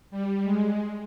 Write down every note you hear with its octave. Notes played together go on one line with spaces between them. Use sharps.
G3
G#3